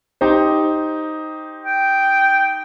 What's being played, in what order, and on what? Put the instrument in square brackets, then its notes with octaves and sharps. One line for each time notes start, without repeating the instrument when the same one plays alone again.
[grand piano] D#4 G4 C5
[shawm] G5